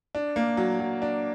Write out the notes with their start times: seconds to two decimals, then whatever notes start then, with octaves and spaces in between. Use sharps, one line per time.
0.15 D4
0.36 A#3
0.57 F#3
0.80 F#3
1.02 D4